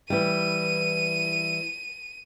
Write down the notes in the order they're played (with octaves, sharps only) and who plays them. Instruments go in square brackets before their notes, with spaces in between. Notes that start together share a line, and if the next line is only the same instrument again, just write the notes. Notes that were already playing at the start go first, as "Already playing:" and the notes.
[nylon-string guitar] E3 G3 [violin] D#7